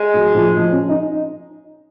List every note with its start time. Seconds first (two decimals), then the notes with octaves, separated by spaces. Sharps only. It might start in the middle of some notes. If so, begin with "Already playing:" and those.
Already playing: G#3
0.14 F#3
0.35 F3
0.57 F3
0.72 C#4
0.89 D#4